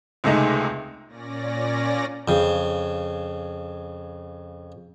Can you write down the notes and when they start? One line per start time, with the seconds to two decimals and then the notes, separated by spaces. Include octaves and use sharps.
0.24 C#2 C3 G#3 A3 D#4
1.07 A#2 C#4 D5 A#6
2.28 F2 C#3